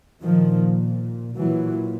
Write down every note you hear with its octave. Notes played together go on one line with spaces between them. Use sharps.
A#2 D#3 F3
A#2 E3 F#3